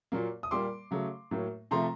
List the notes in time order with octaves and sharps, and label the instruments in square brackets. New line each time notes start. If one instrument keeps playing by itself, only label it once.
[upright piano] A#2 F#3 A#3
D#6
A#2 G3 A#3 C6 D6
C#3 F#3 A3
A2 F#3 A#3
C3 F3 A3 A#5 C6